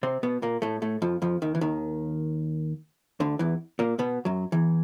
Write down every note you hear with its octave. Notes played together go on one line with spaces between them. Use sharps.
C3 C4
B2 B3
A#2 A#3
A2 A3
A2 A3
F2 F3
F2 F3
D#2 D#3
E3
D#2 D#3
D2 D3
E2 E3
A#2 A#3
B2 B3
F#2 F#3
E2 E3